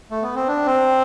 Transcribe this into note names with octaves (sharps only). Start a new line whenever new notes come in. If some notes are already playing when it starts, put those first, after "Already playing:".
A3
B3
C4
D4
C4